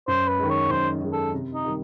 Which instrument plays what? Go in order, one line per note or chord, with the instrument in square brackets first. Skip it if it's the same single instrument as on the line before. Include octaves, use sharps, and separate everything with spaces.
[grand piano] F#2 [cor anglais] C5
[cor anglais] B4
[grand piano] D#3 G#3
[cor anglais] C#5
[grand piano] F#2 [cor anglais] C5
[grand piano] D#3 G#3
[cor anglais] A4
[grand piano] C3
[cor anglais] D#4
[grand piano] D#3 G3